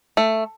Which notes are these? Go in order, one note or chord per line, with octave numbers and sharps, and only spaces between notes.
A3